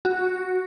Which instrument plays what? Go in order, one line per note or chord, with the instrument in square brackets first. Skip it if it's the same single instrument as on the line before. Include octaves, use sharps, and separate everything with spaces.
[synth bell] F#4